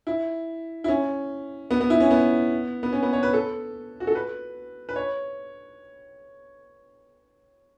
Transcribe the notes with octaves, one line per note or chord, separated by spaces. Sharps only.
E4
E4
C#4
B3
B3
E4
C#4
B3
B3
C#4
B3
C#5
B4
A4
F#4
A4
B4
B4
C#5